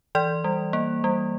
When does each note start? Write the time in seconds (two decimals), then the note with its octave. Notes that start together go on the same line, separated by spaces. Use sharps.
0.15 E3 D5
0.44 G3
0.73 A#3
1.04 G3